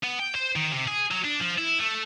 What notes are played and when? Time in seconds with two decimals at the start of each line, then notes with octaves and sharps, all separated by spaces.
0.04 B3
0.20 G5
0.35 C5
0.56 D#3
0.73 C3
0.87 G#4
1.11 F#3
1.24 D4
1.40 F3
1.58 E4
1.79 A3